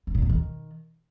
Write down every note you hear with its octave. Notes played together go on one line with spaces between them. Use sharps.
F#2
A#2
E2
D#3